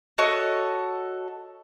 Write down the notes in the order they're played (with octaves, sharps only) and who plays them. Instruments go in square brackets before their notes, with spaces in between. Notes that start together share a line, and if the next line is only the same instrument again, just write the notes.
[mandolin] F#4 A4 C#5 D#5